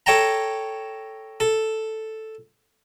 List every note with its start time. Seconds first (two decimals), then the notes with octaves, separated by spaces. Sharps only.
0.06 A4 C#5 G5 A5 A#5
1.40 A4